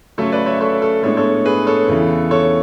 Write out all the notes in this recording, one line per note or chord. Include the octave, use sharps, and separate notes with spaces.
C#3 F#3 A3 C#4 A4 C#5
B4 D5
C#5 E5
A4 C#5
A4
A2 G#3 B3 D4 A4 C#5
A4 C#5
G#4 B4
A4 C#5
E2 C#3 E3
A4 C#5